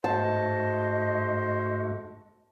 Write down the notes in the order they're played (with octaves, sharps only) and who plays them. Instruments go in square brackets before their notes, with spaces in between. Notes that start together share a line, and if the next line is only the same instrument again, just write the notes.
[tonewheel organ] G#2 A3 F#4 [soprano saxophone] C5 [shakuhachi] D#5 [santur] A5